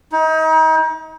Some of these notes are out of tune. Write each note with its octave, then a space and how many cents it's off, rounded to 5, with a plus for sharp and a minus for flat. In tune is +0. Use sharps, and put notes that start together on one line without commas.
D#4 +35